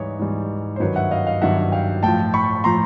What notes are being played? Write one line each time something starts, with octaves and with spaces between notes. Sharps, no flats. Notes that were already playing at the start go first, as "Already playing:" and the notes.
Already playing: G#2 E3 G3 C#5 D#5
G#2 E3 G3
C5
G2 D#3 F#3 B4 C#5
E5 F#5
D#5 F5
D#5 F5
G2 D#3 F#3 E5 F#5
F5 G5
A2 F3 G5 A5
B5 C#6
A2 F3 A#5 C6